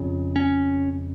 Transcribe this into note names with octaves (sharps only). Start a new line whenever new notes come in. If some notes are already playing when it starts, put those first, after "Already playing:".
Already playing: F2 C#3
C#4